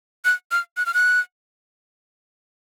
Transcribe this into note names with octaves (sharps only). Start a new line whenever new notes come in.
F#6
F6
F#6
F6
F#6